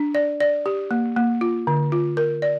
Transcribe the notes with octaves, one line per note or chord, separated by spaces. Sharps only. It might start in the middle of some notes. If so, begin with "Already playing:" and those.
Already playing: D4
D5
D5
G4
A#3
A#3
F4
D3
F4
A#4
D5